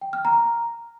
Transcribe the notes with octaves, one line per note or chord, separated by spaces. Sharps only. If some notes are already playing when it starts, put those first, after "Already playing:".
G5
F6
A#5